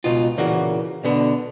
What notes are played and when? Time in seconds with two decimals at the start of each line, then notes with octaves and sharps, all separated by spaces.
0.04 C#2 G2 B2 D#4 F4
0.38 A#2 C#3 E3 A#3 F#4
1.04 B2 D3 B3